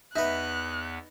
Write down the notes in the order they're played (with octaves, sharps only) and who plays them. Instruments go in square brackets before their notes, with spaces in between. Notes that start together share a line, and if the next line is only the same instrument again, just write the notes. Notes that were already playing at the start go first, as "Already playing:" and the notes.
[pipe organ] E2 B3 [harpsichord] D#4 B4 [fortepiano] E5 [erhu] F#6